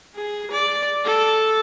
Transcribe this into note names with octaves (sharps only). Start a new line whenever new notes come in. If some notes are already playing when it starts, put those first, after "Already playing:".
G#4
D5
A4